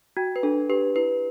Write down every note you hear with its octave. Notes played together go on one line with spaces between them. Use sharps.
F#4 G5
B4
D4 A4
G4 B4
E4 B4